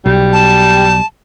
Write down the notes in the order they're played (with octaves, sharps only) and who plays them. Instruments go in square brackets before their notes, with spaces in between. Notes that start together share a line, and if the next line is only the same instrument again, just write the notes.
[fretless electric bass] B1 [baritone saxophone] G3
[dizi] A5